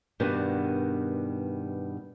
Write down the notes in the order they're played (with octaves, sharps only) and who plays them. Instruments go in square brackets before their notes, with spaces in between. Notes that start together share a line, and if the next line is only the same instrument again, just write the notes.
[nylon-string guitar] G2 B2 D#3 G3 B3 D4